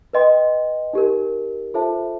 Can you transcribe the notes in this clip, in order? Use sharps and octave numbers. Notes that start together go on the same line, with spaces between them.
B4 D#5 G5 C6
D#4 G4 A#4
F4 A4 C5 E5 A5